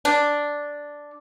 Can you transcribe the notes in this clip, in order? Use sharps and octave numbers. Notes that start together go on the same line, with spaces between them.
D4